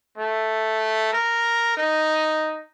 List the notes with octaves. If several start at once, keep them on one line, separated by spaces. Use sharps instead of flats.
A3
A#4
D#4